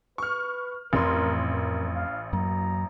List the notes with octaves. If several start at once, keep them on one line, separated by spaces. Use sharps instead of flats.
B4 C#6 F6
A1 F2 A2 C4 A#4 C6
A#4
F5
F#2 F#3 A#3 A#5